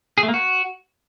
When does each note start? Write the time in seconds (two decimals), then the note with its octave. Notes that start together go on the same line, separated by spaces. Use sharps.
0.18 G#4
0.23 A3
0.28 A#3
0.34 F#4